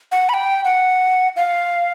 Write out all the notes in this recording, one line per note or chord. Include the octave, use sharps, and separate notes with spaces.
F#5
B5
G5
F#5
F5